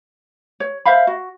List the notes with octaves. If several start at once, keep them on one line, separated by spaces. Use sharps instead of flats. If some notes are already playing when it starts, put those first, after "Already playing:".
C#5
C5 E5 F5 B5
F#4